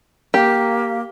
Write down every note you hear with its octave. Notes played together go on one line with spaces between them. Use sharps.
A#3 G4